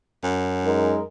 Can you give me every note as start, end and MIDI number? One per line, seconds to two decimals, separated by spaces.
0.23 1.04 42
0.64 1.00 56
0.64 1.00 63
0.64 1.00 70